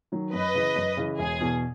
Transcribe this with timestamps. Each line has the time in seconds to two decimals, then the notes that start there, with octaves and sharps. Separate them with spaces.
0.12 D#3 F#3
0.33 F#2 B4 D#5
0.54 C#3 E3
0.76 F#2
0.97 C#3 E3
1.18 E1 G#4
1.40 E2 B2